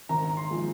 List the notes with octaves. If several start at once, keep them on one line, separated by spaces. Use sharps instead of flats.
G#1 A#5
C6
F3 G#3